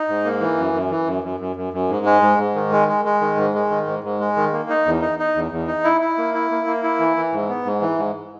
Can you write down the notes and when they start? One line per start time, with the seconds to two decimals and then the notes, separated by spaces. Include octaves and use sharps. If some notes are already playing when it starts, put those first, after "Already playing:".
Already playing: D#4
0.08 G#2
0.25 A#3
0.41 E3
0.57 F#2
0.74 F#2
0.91 E3
1.07 F#2
1.24 F#2
1.40 F#2
1.56 F#2
1.73 F#2
1.89 G#2
2.06 G#3
2.22 G#2
2.38 G#2
2.55 D#3
2.72 G#3
2.88 G#3
3.05 G#3
3.21 D#3
3.37 G#2
3.54 G#3
3.70 D#3
3.87 G#2
4.04 G#2
4.20 G#3
4.36 D#3
4.53 A#3
4.70 D#4
4.86 E2
5.02 D#4
5.19 D#4
5.35 E2
5.51 E2
5.67 D#4
5.84 E4
6.01 E4
6.18 A#3
6.34 E4
6.51 A#3
6.67 A#3
6.83 E4
6.99 E3
7.16 E3
7.32 G#2
7.49 B3
7.65 G#2
7.81 E3
7.98 G#2